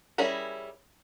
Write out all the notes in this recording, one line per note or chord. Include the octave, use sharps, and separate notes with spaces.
G3 C#4 E4 G#4 A#4